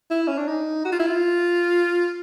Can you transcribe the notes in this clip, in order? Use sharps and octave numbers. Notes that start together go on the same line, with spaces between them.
E4
C#4
D4
D#4
F#4
F4
E4
F4